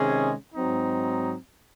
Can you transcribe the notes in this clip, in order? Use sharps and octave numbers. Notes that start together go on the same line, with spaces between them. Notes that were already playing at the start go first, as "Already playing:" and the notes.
Already playing: C3 D#3 G#3 C#4 G#4
G#2 F#3 C4 D#4